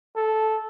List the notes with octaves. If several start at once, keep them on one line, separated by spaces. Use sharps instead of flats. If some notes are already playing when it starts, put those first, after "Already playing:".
A4